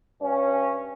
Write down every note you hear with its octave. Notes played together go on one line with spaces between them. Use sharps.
G2 C#4